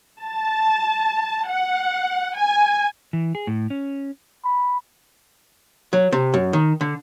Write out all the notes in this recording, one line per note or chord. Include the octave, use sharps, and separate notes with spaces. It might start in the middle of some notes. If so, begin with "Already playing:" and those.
A5
F#5
G#5
E3
G#4
A2
C#4
B5
F#3
C3
F#2
D#3
D3